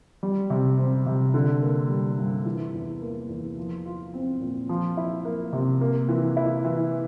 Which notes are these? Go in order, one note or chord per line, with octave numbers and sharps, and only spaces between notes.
G3
C3
C4
C3
D3
A#3
G3
G2
E3
E2
A#3
E2
F3
F4
C4
A#2
F3
E4
A#3
C3
A#3
E3
E4
E3